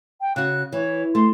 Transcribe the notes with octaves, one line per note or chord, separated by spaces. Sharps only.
G5
C#3 F#4 F#6
E3 C#5
A3 C6